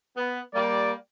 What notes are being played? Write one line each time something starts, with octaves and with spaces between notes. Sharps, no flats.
B3
G3 A#3 D5